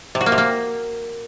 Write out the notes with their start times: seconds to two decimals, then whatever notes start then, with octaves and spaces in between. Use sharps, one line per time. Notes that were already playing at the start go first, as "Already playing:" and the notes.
0.15 C3
0.21 F#4
0.26 A#3
0.32 C3
0.38 A#3